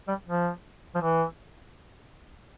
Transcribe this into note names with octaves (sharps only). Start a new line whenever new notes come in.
G3
F3
F3
E3